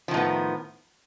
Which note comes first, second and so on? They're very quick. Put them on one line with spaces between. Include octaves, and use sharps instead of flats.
F3 D#3 A2 B3